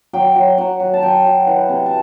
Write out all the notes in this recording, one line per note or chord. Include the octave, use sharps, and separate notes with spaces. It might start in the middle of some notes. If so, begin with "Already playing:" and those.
F#3 G5
F#3
F#3 F#5
F#3
A5
F#3 G5
F#3
E3 F#5
C3
A5